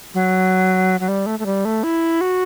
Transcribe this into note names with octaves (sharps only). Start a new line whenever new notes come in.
F#3
F#3
G3
A3
A3
G3
A3
E4
F#4